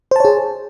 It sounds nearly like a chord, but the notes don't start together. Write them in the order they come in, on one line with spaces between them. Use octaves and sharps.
C5 A5 C#5 G#4